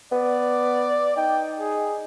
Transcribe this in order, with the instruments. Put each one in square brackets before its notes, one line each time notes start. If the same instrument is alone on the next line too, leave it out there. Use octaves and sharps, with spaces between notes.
[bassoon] B3 [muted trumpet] D5
[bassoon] D#4 [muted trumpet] G5
[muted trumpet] G#4